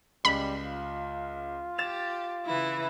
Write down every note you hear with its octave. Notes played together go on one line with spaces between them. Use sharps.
C#2 G3 B5
F4
G4 A6 E7 F7
C#3 E3 E4